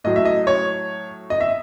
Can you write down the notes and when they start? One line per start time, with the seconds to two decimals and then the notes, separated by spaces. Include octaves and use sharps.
0.04 A2 F#3 D#5
0.16 E5
0.25 D#5
0.47 C#5
1.30 D#5
1.41 E5